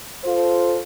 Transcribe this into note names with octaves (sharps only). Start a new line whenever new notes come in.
F4 A4 C5